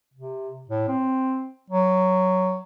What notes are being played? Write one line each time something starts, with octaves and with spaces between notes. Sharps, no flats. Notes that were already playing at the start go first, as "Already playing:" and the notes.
C3
A2
C4
F#3